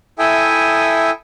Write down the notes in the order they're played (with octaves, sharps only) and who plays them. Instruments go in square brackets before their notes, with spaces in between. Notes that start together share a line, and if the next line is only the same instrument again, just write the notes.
[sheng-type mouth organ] E4 A4 E5 G5 G#5 D#6